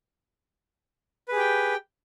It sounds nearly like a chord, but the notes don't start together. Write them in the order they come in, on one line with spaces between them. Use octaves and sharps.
B4 G#4 G4 G5